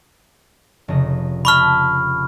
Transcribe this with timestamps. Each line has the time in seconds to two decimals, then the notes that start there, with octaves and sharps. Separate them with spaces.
0.88 F1 C#3 D#5
1.45 D#5 A5 B5 C#6 F6 B6